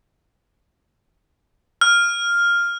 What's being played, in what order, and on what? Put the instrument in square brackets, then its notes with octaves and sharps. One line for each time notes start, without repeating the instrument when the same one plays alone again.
[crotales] F6